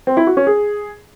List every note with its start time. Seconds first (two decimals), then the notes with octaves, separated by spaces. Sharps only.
0.07 C4
0.17 E4
0.27 F#4
0.37 C#4
0.47 G#4